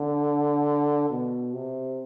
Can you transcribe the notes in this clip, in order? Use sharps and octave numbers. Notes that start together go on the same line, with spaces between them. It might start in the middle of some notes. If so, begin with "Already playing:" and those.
Already playing: D3
B2
C3